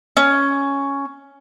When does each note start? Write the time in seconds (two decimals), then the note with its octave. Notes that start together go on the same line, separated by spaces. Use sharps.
0.17 C#4